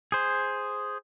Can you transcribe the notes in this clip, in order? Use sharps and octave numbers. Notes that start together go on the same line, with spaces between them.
G#4 C5